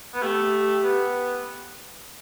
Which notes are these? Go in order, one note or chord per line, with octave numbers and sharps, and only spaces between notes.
B3
A3 G4
B3